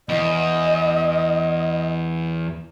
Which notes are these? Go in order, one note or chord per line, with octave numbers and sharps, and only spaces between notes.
E2 D#5